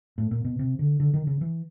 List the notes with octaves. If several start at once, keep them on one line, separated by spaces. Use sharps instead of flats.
A2
A#2
B2
C3
D3
D3
D#3
C#3
E3